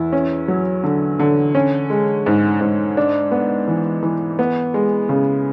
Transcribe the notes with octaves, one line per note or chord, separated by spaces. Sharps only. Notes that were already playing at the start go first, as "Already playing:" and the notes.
Already playing: E2 E4
C#4
F#3
D3
D3
C#4
G#3
G#2
G#2
D4
B3
E3
E3
B3
G#3
C#3